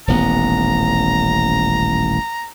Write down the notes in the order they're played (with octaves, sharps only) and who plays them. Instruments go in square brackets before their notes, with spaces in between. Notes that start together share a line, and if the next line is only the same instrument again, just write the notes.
[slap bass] D#1 A1 B3 [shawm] A#5